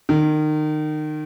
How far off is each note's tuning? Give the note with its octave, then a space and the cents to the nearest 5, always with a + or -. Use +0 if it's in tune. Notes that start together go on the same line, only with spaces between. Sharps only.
D#3 -25